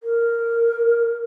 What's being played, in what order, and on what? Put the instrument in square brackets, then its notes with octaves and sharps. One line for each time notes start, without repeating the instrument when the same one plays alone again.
[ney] A#4